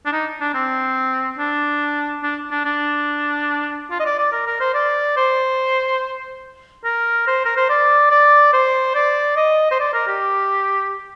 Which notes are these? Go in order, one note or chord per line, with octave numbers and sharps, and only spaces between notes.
D4
D#4
D4
C4
D4
D4
D4
D4
F4
D#5
D5
D5
A#4
A#4
C5
D5
C5
A#4
C5
A#4
C5
D5
D5
C5
D5
D#5
C5
D5
A#4
G4